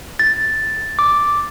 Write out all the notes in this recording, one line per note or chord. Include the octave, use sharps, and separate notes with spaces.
A6
D6